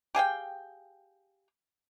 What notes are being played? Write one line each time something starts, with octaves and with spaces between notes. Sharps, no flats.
G4 G#4 F5 G5